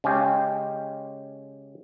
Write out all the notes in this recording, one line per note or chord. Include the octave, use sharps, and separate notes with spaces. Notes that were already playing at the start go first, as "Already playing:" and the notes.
C#3 G#3 C#4 G4